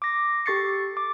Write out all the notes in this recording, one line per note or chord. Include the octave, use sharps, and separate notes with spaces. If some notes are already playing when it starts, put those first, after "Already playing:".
D6 A#6
G4 A4 C#6 A6 C7 C#7
D6